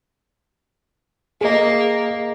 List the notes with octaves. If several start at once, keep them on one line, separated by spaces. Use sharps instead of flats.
A#3 G#4 D#5